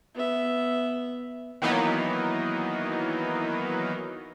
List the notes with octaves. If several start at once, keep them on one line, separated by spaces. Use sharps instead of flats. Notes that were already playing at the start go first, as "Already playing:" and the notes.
B3 E5
D#3 E3 F#3 A#3 B3 D#4